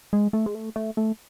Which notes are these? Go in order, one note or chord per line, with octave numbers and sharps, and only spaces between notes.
G#3
A3
G#3
A3
A3
A3